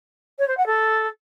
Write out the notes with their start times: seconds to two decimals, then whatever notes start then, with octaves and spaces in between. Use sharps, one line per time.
0.39 C#5
0.48 C5
0.57 F#5
0.67 A4